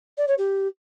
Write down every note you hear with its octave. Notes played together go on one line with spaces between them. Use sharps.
D5
C#5
G4